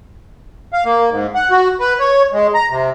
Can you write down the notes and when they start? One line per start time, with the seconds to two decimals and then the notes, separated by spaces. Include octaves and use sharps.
0.73 F5
0.85 A#3
1.11 G#2
1.35 F#5
1.50 F#4
1.80 B4
2.00 C#5
2.33 G#3
2.54 A#5
2.70 C3